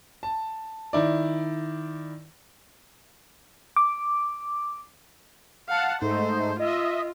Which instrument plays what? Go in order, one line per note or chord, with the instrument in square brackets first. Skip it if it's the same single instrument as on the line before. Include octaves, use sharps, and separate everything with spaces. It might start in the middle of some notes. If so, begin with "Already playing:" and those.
[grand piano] A5
D#3 E4 D5
[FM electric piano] D6
[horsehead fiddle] F5 [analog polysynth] F#5 A5
[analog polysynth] G#2 A3 D#4 [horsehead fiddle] C5
[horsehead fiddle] F4 [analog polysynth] D#5 E5